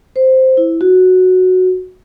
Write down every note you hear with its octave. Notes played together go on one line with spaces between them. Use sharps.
C5
E4
F#4